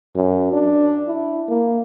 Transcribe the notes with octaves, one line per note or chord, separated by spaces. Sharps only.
F#2
D4
E4
A#3